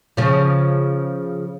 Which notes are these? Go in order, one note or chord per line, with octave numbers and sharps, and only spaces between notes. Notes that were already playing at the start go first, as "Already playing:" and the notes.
C#3 F3